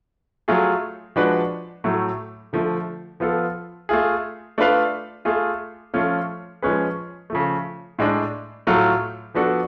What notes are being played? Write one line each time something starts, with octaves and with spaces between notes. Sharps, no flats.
F#3 A3 F4 G#4
F3 G#3 D4 F#4 B4
A2 F#3 A3
D3 F3 A3
F3 B3 F4 A4
A3 F4 G#4
A3 D4 F4 B4 F5
A3 F4 G#4
F3 A3 C#4 F4
F3 G#3 C#4 G#4 B4
C#3 F3 A3
A2 G#3 D4
A2 F#3 A3 F4
F3 B3 D4 F#4 A4